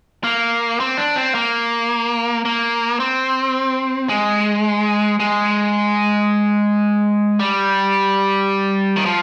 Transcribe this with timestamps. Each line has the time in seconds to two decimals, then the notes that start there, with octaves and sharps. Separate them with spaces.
0.24 A#3
0.80 C4
0.97 D4
1.16 C4
1.35 A#3
2.45 A#3
3.00 C4
4.09 G#3
5.20 G#3
7.39 G3
8.96 D#3
9.06 F3